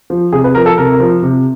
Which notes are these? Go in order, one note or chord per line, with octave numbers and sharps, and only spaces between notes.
F3
C3 G#4
B4
F3 A#4
A4
C3 A#4
F3
C3